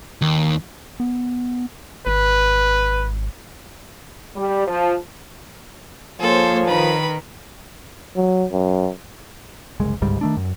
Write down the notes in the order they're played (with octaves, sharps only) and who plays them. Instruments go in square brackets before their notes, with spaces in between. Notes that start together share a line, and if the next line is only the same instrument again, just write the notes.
[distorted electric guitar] D#2
[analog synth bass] B3
[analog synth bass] G#1 [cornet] B4
[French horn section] G3
F3
[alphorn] F3 [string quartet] A#3 G#4 C#5 [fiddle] A4 C5
[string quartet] D#3 A#4 [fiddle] B4 B5
[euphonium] F#3
F#2
[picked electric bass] F#1 C2 G#3
G1 C#2 G#2 G3
D#3 A3 D4
F#2